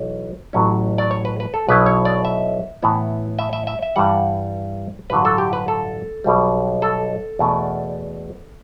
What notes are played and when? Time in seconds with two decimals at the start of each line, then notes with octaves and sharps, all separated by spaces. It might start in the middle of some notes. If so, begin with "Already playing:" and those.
Already playing: B1 E3
0.53 A1 A2 F#3 A3 C#4
0.98 D5
1.11 C#5
1.25 B4
1.40 B4
1.54 A4
1.68 B1 B2 F#3 B3 E4 B4
1.86 C#5
2.05 D5
2.25 E5
2.82 A2 E3 B3 E4
3.39 E5
3.53 E5
3.67 E5
3.82 E5
3.96 G2 E3 G3 F#5
5.10 A1 G2 D3 F#3 B4
5.25 A4
5.38 G4
5.53 B4
5.68 A4
6.24 B1 B2 G3
6.82 A4
7.39 E2 B2 A3 D4